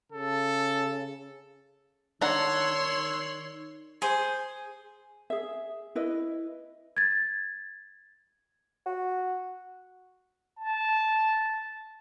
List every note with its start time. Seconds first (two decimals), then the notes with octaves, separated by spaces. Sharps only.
0.12 C#3 A4
2.21 D#3 D4 C#5 F#5 A#5 C6 E6 F#6
4.02 G#4 C5
5.30 G#4 E5
5.95 E4 B4 D#5
6.97 G#6 A6
8.86 F#4
10.58 A5